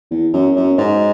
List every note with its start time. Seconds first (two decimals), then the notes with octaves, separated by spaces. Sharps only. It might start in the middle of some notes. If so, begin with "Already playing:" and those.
0.11 E2
0.33 F#2
0.56 F#2
0.78 G#2